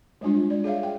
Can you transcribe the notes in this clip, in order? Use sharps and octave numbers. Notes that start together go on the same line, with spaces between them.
G3 G#3 D4 F4
D5
G#4 C#5 E5 F5
G5